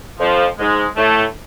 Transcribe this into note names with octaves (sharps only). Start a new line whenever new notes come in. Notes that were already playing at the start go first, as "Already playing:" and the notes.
F2 F3
G#2 G#3
A2 A3